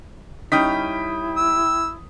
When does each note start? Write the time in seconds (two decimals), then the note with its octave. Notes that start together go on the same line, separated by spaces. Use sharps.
0.52 G3 C#4 D#4 E4 G5 D#6 B6
1.37 E6